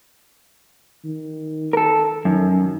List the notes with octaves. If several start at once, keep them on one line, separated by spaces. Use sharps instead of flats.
D#3
A4 A#4
F#2 D#3